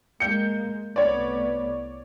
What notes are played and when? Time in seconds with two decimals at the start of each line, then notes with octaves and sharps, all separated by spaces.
0.20 G#3 A#3 G6 C#7
0.96 C2 A3 B3 C#5 D5